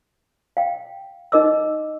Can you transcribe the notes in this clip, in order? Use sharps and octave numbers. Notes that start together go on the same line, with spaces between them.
F5 G5
D#4 A#4 D#5 D6 E6